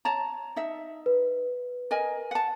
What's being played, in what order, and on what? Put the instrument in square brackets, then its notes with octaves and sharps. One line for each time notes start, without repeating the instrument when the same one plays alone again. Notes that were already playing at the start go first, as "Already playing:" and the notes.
[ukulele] C#5 A5 A#5
D#4 E5
[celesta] B4
[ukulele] A#4 D#5 G#5
F#5 A5